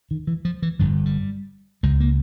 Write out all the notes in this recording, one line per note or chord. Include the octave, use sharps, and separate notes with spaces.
D#3
E3
F3
E3
G1 G2 D3 F3
G3
C#2 C#3 G#3
A#3